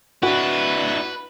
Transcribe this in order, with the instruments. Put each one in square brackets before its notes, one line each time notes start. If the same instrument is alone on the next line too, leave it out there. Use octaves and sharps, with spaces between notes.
[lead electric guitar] D4 E4 [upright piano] F#4 [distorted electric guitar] B4